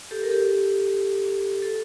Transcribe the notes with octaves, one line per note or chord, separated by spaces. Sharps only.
G4 A4
A#4
G4 A4
A4